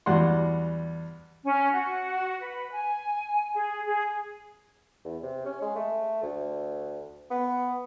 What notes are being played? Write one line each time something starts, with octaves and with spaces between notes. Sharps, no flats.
E2 G3 F#4 F#5 C6
C#4
F#4
B4
G#5
G#4
G#4
E2
C3
C#4
G#3
A3
D2
B3